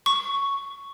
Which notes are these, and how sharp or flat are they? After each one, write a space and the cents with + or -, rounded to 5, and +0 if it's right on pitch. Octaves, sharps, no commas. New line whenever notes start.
C#6 +5